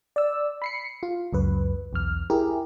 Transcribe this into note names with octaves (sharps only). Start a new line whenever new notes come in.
D5 E6
B5 C7 C#7
F4
C#2 F#2 B4
B1 E2 F6
E4 G4 G#4 A#4